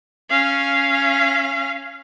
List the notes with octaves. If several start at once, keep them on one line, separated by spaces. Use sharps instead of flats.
C#4 F5